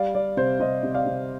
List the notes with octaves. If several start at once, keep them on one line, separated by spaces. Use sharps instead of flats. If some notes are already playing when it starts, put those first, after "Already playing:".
Already playing: G3 D5 F5
G3 D5
C3 C5
C3 C5 D#5
C3
D5 F5
C3